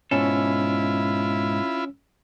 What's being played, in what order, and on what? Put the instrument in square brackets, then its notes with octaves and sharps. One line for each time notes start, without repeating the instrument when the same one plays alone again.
[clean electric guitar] G#2 B2 A4 [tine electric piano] C#4 [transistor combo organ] E4 F4 B5